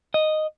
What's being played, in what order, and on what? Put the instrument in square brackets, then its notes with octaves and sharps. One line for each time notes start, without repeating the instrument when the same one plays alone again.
[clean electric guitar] D#5